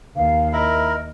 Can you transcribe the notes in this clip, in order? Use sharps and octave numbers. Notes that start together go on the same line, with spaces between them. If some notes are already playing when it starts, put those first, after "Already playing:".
D#2 F5
E4 A#4 D#5